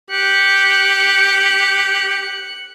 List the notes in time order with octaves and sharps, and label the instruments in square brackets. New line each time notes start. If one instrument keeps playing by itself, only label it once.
[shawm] G4 [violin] F#6 C#7